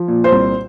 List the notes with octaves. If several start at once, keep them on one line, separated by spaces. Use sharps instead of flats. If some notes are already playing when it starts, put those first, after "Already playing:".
Already playing: F3
A#2
C5
C2